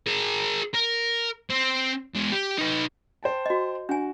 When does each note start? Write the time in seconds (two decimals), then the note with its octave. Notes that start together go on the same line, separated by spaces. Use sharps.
0.07 G#4 A#4
0.74 A#4
1.50 C4
2.14 E2 G#3
2.32 G4
2.58 D#4 B4
3.23 C5 G5 A5
3.46 F#4 D#5
3.89 D4 F#4 G#5